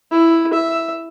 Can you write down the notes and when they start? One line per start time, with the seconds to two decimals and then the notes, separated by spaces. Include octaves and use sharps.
0.12 E4
0.54 E5